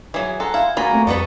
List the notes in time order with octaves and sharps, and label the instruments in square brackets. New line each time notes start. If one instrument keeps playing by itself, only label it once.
[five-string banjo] E3 F#3 [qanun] G#4
[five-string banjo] A4 [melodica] F#5 A#5 C6
[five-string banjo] E4 [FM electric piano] F5
[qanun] A#3 [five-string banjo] F4 B5 [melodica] F#4 G#5 A#5
[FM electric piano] A3 C4
[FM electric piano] F2 [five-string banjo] G3 B3 B4 [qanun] F4 A4 D#5 [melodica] C#6